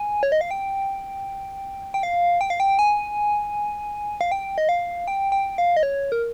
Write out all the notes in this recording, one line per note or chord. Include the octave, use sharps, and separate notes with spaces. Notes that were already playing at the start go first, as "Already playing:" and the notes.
Already playing: G#5
C#5
D#5
F5
G5
G5
F5
G5
F5
G5
G#5
F5
G5
D#5
F5
G5
G5
F5
D#5
C#5
A#4